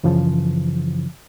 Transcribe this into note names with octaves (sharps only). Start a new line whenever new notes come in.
F#2 C#3 E3 F3